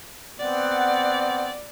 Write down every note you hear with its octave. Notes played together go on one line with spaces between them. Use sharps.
B3 C4 D5 F#5